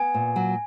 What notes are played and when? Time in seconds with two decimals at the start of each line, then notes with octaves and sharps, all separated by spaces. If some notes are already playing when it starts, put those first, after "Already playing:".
Already playing: B3 G#5
0.14 A#2
0.36 F#3